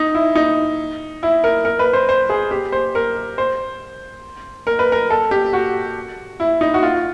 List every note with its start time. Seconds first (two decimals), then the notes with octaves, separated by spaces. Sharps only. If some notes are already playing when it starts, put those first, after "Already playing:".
Already playing: D#4
0.15 E4
0.35 D#4
1.23 E4
1.44 A#4
1.65 A#4
1.79 B4
1.93 C5
2.09 C5
2.29 G#4
2.51 G4
2.72 C5
2.95 A#4
3.38 C5
4.67 A#4
4.79 B4
4.92 A#4
5.10 A4
5.31 G4
5.53 F#4
6.40 E4
6.61 D#4
6.74 F#4
6.83 F4